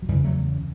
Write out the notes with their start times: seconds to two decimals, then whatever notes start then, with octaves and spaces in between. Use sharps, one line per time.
0.02 F#3
0.08 E2 C#3 E3 G3
0.24 F#3 A3